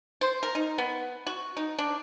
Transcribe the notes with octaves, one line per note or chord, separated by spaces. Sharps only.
C5
A#4
D#4
B3
F#4
D#4
D4